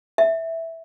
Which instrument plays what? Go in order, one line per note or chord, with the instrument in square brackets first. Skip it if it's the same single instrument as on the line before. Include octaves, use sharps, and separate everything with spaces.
[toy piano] E5